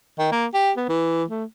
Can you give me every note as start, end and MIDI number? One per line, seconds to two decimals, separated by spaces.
0.19 0.27 51
0.32 0.46 58
0.54 0.71 67
0.77 0.86 59
0.89 1.24 52
1.29 1.45 57